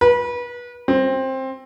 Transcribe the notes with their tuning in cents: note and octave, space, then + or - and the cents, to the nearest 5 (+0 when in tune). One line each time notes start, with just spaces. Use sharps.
B4 -30
C4 +15